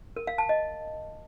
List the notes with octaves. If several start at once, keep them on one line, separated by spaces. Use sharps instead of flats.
A#4
F5
A5
D#5